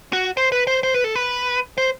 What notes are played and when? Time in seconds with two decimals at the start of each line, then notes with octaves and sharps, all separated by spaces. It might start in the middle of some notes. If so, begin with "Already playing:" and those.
0.13 F#4
0.37 C5
0.52 B4
0.67 C5
0.83 C5
0.94 B4
1.04 A4
1.16 B4
1.78 C5